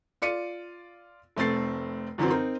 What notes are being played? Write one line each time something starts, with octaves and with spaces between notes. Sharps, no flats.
F4 D5 C#7 D#7
F1 A3 C4 A6 C7
F#2 D3 E3 F#3 C4
C4 D#4 A#4